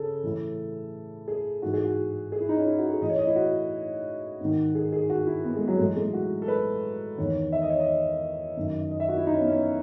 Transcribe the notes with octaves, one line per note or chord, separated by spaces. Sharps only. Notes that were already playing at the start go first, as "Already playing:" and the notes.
Already playing: C#3 G#4 A4
A2 E3
G#4
G#2 E3 F#4
G#4
F#4
G#4
E4
D#4
C#4
E4
F#4
G#4
A2 E3 D#5
C#5
D#5
E4
F#4
G#2 D#3
G#4
G#4
F#4
E4
B3
G#3
F#3
A2 E3 G#3
G#3
F#4
A4
B4
E2 D#3 C#5
E5
D#5
C#5
D#5
F#2 D#3
D#5
E5
F#4
E4
D#4
C#4
B3
C#4